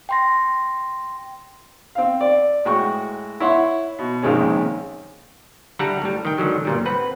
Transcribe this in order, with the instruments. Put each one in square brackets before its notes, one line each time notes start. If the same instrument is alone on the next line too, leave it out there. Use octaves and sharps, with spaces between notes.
[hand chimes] G5 C6 A#6
[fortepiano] C4 F5
D5
A2 G#3 F#4 G5 C#6
E4 C#5 F#5 C6
B2
A#1 C3 D#3 G#3 C#4
[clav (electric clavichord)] D3 G3 E4 A4 F#5 A#5
A2 G3
D#3 G5
G#2 D3 D#3 F#3
G1 A#2 G3
C4 B4 F#5